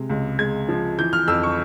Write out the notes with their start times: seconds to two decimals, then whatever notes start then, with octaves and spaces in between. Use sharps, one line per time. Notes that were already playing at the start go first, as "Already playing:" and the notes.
Already playing: C3 G#3
0.10 C#2
0.39 G#3 G#6
0.69 F3
0.99 E3 G6
1.13 F6
1.28 F2 E6
1.43 C#6